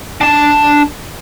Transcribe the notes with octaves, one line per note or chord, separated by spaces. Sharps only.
D4 A5